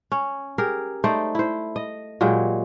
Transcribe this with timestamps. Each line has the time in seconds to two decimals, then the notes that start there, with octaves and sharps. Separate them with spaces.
0.12 C#4
0.58 G4 G#4 A#4
1.04 A3 D#4 C5 D5
1.35 E4 C5
1.76 D#5
2.21 A#2 F#3 G#3 G4